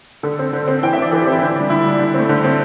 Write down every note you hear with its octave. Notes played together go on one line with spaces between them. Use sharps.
D3 A4
C4
D3
C4
E3 G5
C4 E5
D5
E3 A4
G4
C4
E4
D3 D4
G3 D4
D3 E4
G3 D4
D3
A3 C4
D3
A3 C4